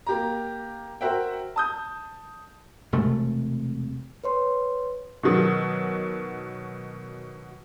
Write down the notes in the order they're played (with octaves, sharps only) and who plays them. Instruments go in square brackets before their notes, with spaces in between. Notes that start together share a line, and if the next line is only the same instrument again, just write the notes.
[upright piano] A#3 G4 A#5
F#4 A#4 C5 E5 F#5 G5
A5 D#6 G6
[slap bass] E1 C3 G#3 A3
[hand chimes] B4 C#5 C6
[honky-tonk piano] B2 D#3 F#3 D#6